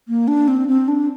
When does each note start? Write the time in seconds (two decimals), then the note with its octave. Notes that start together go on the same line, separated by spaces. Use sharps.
0.08 A#3
0.28 D4
0.48 C4
0.68 C4
0.88 D4